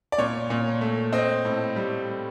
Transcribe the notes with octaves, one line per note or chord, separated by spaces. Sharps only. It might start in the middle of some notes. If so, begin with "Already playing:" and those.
D5
A#2 C#5
A#2
A3
C4 D#5
A2
G3